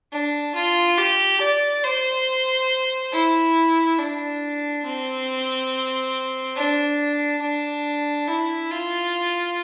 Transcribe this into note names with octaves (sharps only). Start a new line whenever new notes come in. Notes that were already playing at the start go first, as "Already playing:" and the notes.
D4
F4
G4
D5
C5
E4
D4
C4
D4
D4
E4
F4